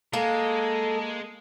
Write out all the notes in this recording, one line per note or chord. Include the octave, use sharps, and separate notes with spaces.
G#3 A#3 A4